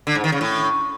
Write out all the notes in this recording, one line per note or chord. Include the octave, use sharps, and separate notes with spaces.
D3
G#2
D#3
C#3
A2